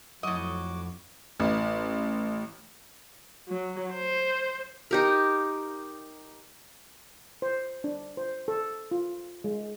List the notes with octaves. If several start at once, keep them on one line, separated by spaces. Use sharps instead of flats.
F2 A2 F#3 F#4 D#5 D6
A1
F#3
C5
D#4 G4 A#4
C5
D4
C5
A4
F4
G#3